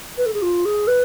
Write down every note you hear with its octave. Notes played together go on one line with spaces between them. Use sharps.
B4
A4
G#4
F4
G#4
B4